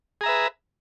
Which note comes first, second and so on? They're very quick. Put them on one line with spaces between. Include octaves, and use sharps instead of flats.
G#4 A#5 E5 B4